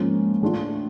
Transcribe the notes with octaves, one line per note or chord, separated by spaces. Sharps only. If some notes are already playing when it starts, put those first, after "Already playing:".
Already playing: G#2 F3 A#3 C#4
A2 E3 A3 D4 F4